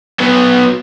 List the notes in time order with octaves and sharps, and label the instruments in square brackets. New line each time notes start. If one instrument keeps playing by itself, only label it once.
[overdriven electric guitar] F#3 B3